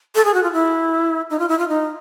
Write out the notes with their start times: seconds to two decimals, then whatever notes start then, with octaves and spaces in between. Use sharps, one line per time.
0.15 A4
0.25 G#4
0.34 F#4
0.43 F4
0.53 E4
1.30 D#4
1.39 F4
1.49 E4
1.59 F4
1.68 D#4